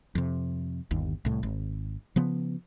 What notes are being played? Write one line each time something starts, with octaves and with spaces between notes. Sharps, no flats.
F2 C3
G1 D#2
C2 A2
G#1
C#3 F3 B3